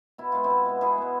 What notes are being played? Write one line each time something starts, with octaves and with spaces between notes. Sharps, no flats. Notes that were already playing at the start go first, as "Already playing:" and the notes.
B2 E4
G#3 B3 F4
C4 E4
B2
G#3 B3
B2 E4 G#4
G#3 B3